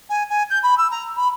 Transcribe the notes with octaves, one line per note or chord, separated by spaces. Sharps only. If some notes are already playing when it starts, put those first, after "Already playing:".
G#5
G#5
G6
B5
E6
A#5
B5